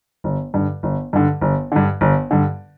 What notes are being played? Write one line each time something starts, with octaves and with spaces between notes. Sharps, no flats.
G1
G2 D3
G1
G2 D3
G1
G2 D3
G1
G2 D3